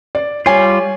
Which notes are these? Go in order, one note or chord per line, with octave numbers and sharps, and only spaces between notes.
D5
G3 F4 C#5 G#5